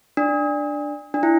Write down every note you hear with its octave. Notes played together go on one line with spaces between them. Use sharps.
D4
D4
E4